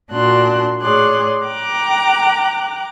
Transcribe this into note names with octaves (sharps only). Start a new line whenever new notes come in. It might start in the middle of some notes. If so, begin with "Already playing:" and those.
A#2 D4 F#4 C6 F#6
A2 G#4 C#5 D5 C6 F#6
G5 A#5 D6 F#6